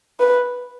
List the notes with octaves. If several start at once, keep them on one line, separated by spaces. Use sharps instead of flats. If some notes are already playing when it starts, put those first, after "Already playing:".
B4